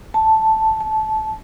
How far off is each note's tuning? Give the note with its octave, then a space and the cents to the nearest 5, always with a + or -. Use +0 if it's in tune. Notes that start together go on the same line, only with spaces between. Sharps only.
A5 +0
A5 -20